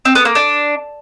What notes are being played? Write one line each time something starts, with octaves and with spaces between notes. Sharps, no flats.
C4
B3
A#3
D4